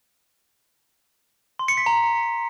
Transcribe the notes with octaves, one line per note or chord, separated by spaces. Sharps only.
C6
C#7
B6
A#5